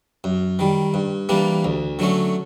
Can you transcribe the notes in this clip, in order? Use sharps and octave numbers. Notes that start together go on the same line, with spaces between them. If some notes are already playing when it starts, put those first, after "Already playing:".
F#2
D#3 G3
G2
E3 G3 A#3 D4
D2
D3 F#3 A3 C#4